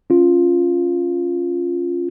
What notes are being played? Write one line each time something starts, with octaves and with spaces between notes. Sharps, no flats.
C#4 F4